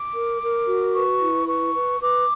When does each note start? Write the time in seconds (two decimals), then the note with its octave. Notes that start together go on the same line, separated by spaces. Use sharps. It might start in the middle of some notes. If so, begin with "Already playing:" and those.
Already playing: D6
0.14 A#4
0.42 A#4
0.68 F#4
0.94 B4 C#6
1.21 E4
1.47 B4 C#6
1.74 B4
2.00 B4 D6